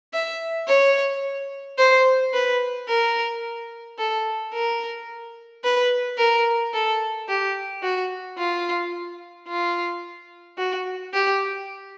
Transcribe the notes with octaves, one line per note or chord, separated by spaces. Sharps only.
E5
C#5
C5
B4
A#4
A4
A#4
B4
A#4
A4
G4
F#4
F4
F4
F#4
G4